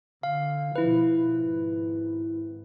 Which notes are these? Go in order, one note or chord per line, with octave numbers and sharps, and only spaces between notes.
D3 F5
B2 F3 E4 B4
G#1